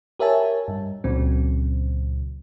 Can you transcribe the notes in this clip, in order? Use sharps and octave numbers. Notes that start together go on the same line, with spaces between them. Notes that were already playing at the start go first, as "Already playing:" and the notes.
G4 A#4 C#5 E5 G#5 A5
G2
C#2 A#2 C#3 F#3 C4